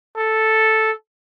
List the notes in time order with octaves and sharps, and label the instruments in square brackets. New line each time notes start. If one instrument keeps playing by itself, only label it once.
[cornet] A4